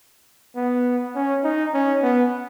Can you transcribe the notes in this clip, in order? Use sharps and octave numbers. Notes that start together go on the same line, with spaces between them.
B3
C#4
D#4
C#4
B3